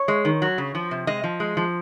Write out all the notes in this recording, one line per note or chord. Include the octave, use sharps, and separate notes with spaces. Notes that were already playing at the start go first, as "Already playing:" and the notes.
Already playing: C#5
G#3
D#3
F#3
C#3
F3
C3
G#3 D#5
F3
G#3
F3